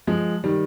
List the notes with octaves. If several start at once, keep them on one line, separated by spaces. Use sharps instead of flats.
F3 G#3
D#3 G3